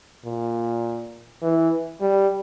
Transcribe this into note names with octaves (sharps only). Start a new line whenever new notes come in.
A#2
E3
G3